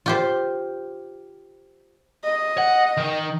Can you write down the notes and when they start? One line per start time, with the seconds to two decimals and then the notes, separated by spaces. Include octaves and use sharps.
0.06 F4 G4 C5
2.24 D#5
2.58 F#5
2.97 D#3